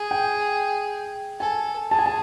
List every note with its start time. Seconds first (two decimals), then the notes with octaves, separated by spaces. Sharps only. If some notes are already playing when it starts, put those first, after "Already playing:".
Already playing: G#4
0.11 G5
1.40 A4 G#5
1.91 G#4 A5
1.99 G#5
2.06 A5